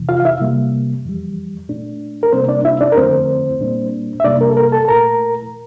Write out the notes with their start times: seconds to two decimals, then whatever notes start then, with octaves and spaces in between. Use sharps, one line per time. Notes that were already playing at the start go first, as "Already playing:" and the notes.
Already playing: F2 C3 E3
0.09 F4 F5
0.20 F5
0.25 E4 E5
0.41 C3 G3 A#3
1.05 F2 E3 G3
1.69 A#2 A3 D4
2.23 A#4
2.32 C3 G3 A#3 C4 D4 C5
2.49 D4 D5
2.65 E4 E5
2.81 D4 D5
2.92 A#4
2.97 F2 D3 A3 C4 E4 C5
3.60 A#2 G3 A#3 D4
4.20 E5
4.24 F2 C3 G3 A#3 D4 D5
4.41 A#4
4.50 A4
4.57 A#4
4.72 A4 A5
4.85 A5
4.88 A#2 A3 E4 A#4 A#5